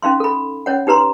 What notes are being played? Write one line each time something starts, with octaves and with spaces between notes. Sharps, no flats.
C#4 D#4 F5 C6
A4 B5
C#4 C#5 F#5
D#4 G4 B4 A#5 C6